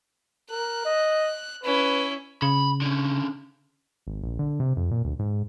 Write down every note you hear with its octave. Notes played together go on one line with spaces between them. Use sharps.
A#4 F#6
D#5
C#4 E4 B4
C#3 B5
D3 C#4
G#1
A#1
D3
C3
F2
A#2
D2
G#2